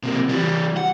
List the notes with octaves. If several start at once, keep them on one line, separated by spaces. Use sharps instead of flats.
C3 A#3
E3 G3
F#5